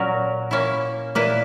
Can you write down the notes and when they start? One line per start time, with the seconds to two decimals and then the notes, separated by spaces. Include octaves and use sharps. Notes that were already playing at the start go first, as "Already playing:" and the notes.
Already playing: A#2 F#3 C#4 F#4 A#4
0.51 A#3 C#4 E4
1.15 A#2 A#3 E4 B4